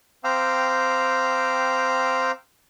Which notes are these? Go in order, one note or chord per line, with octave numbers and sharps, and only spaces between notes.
C4 F5 G5 A#5 D6 E6